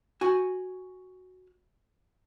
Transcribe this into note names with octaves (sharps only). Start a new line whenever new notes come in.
F#4 G#5